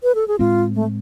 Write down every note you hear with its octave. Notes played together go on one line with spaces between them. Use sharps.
B4
A4
G#4
A2 G#3 C4 F4
A3